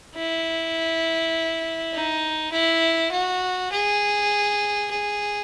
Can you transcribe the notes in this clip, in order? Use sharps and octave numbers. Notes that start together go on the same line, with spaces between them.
E4
D#4
E4
F#4
G#4
G#4